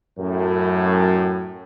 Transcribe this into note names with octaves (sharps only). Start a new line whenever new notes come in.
F#2 A2